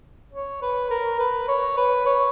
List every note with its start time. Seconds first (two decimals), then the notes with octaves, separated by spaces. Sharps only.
0.33 C#5
0.62 B4
0.91 A#4
1.19 B4
1.48 C#5
1.77 B4
2.06 C#5